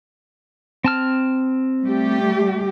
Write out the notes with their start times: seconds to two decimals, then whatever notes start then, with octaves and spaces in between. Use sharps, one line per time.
0.84 C4 A5 F6
1.83 G3 A3 G4